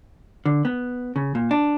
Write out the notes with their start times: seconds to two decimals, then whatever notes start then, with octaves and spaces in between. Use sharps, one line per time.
0.45 D3
0.65 B3
1.16 C#3
1.35 A#2
1.51 D4